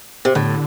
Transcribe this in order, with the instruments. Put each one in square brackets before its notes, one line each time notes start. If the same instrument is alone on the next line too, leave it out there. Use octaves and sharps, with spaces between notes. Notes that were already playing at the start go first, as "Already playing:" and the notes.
[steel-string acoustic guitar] C3
[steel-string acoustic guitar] A2 [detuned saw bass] D3